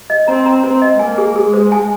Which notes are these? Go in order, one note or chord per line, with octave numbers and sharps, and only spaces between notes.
D#5
C4 A#5
A#5
C4 C5
D#5
A#3 G#5
G#4
G#3 G#4
C5
G#5